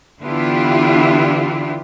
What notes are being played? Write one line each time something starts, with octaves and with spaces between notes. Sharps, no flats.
D3 E3 B3 E4 F4 G4